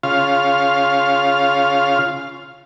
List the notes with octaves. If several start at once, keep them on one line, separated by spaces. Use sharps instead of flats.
C#3 F4 F5